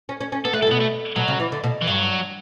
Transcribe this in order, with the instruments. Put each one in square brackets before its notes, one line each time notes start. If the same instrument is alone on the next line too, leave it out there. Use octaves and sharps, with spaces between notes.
[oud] C#4
C#4
C#4
[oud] B3 [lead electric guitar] A4
[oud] A3 [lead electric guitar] B4
[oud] G3 [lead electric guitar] A4
[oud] A2
[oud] B2 [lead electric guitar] B3
[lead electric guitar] A3
[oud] B2 [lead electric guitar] F#3
[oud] C#3
E3
D3
B2
[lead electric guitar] E3
[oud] G2 [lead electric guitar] F#3